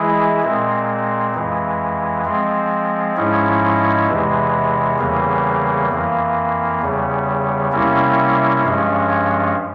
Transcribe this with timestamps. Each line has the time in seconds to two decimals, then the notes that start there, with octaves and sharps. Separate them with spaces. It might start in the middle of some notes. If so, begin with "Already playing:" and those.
Already playing: E3 G#3 E4 G#4
0.43 A#2 G#3 C4
1.34 F2 E3 G#3
2.25 F3 G#3 C4
3.16 G#2 F3 G#3 C#4 E4
4.07 E2 C3 E3 G#3
4.98 E2 C#3 E3 G3 A#3
5.90 F2 E3 A#3
6.80 E2 C#3 G3
7.72 C3 G3 A#3 C#4 E4
8.62 G2 F3 G#3 C#4